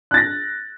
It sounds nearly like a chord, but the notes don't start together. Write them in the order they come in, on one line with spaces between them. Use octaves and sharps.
F#6 A6 A#6